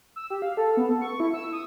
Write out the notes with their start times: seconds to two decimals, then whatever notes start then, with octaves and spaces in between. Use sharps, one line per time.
0.16 E6
0.30 G4
0.42 F5
0.57 A4
0.77 B3
0.89 A4
1.01 C#6
1.20 E4
1.33 E6
1.53 D#6